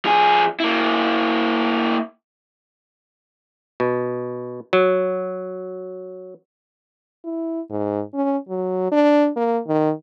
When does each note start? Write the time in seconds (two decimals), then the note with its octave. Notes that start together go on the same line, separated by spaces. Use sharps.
0.05 F3 G#4
0.60 A#3 E4
3.80 B2
4.73 F#3
7.24 E4
7.70 G#2
8.14 C#4
8.49 F#3
8.92 D4
9.36 A#3
9.68 D#3